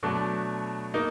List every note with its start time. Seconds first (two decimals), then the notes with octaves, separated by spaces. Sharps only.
0.03 B2 F#3 A3 D4
0.94 A#3 D#4